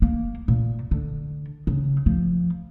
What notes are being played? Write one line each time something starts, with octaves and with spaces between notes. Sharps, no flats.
A#3
A#2
D3
C#3
F3